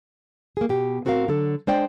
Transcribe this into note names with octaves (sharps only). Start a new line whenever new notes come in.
A#3 G#4
B2 G4
A2 C4 F#4 G#4 A#4 F5
D3 F#3 A4
G#3 D4 C5 D5 G5